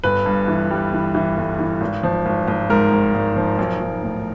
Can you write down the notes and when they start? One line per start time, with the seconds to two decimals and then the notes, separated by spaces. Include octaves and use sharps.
0.04 G1 B4
0.26 G2
0.48 E3
0.71 G3
0.93 E3
1.15 E3
1.37 G1
1.59 E3
1.81 G#1
2.03 F3
2.26 G#1
2.48 G#1
2.70 G#2 A#4
2.92 G#1
3.14 G#1
3.36 F3
3.58 B1
3.81 B1
4.03 A2